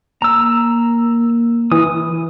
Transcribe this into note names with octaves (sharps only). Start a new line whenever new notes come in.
A#3 A#5 E6
E3 D#6